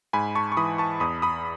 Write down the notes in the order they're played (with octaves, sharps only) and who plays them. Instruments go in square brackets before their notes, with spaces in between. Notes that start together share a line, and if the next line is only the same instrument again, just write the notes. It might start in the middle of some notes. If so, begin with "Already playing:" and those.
[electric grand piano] G#2 G#5 B5
A5 C#6
C#6
E3 B5 D#6
A5 C#6
E2 B5 D#6
B5 D#6